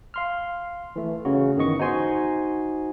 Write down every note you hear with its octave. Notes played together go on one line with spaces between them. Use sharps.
F5 C6 F6
E3 A3
C#3 C#4 F#4
G1 D#3 E3 B3 D#5 C#6
D#4 F#4 C5 G#5 C6